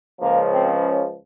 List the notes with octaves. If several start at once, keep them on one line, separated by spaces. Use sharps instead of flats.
C#2 C#3 F3 A#3
C4
C#4